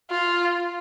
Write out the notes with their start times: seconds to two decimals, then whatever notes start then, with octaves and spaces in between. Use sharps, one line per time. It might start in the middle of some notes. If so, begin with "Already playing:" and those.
0.10 F4